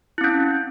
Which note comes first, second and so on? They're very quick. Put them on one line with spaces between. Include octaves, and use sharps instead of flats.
E4 C4 C#4